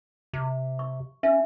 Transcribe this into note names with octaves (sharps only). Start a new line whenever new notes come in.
C3
C#6
C#4 E5